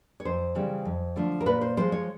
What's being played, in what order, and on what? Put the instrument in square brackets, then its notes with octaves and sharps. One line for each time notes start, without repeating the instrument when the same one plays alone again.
[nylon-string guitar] C#5
F2 C5
C#3 E3 G3 C4
F2
D3 F3 A3
A#4
A#2 B4
C5
F3 G#3 C5
C#5